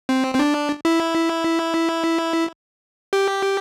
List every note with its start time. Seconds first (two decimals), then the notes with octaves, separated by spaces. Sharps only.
0.09 C4
0.35 C4
0.39 D4
0.85 E4
3.13 G4